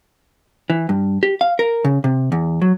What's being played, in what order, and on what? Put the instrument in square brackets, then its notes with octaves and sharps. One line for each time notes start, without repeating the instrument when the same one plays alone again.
[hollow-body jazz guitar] E3
G2
G4
F5
A#4
C#3
C3
E2
F#3